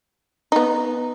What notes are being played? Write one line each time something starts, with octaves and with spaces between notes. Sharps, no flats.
B3 D#4